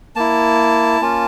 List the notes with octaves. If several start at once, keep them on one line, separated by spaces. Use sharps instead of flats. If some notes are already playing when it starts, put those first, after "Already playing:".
A#3 E4 A5
A#3 C#4 F4